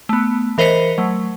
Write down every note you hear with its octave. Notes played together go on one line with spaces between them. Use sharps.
A3 B3
E3 A#4 C5 D#5 B6 C#7
F#3 A3